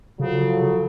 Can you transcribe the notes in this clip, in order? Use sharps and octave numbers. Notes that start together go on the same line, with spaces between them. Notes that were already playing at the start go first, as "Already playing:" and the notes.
C#3 F3 F#3 A4